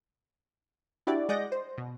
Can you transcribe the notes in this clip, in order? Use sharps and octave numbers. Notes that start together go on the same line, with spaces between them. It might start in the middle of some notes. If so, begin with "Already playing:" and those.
D4 E4 F#4 G4 D5
G#3 D5 D#5 F#5 G6 A#6
C5
B2